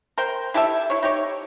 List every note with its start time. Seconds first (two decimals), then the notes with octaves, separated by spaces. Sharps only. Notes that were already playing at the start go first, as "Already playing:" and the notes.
0.18 A#4 C5 G5
0.54 E4 G4 A4 E5
0.90 E4 C#5
1.03 D#4 G4 C#5